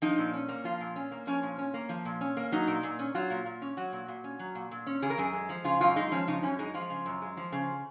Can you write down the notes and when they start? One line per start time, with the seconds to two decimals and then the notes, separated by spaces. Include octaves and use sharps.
0.02 F3 D#4
0.18 A#2
0.33 C#4
0.49 A#3
0.64 F3 F4
0.80 A#2
0.96 C#4
1.11 A#3
1.27 F3 C#4
1.43 A#2
1.58 C#4
1.74 A#3
1.89 F3
2.05 A#2
2.21 C#4
2.37 A#3
2.52 F#3 D#4
2.67 A#2
2.83 A#2
2.99 C#4
3.15 F#3 F4
3.30 A#2
3.45 A#2
3.62 C#4
3.77 F#3 F#4
3.93 A#2
4.08 A#2
4.24 C#4
4.39 F#3
4.55 A#2
4.71 A#2
4.86 C#4
5.02 C#3 G#4
5.10 A#4
5.18 F#2 G#4
5.33 G#3
5.49 F3
5.64 C#3 F4
5.81 F#2 F4
5.96 G#3 D#4
6.12 F3 C#4
6.28 C#3 D#4
6.43 F#2 C#4
6.59 G#3 D#4
6.74 F3 F4
6.90 C#3
7.06 F#2
7.22 G#3
7.37 F3
7.52 C#3